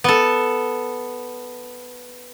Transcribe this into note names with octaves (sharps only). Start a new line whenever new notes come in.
B3 A4